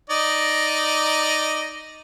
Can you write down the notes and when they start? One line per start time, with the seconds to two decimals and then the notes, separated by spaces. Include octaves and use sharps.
0.10 D#4 D5 D#5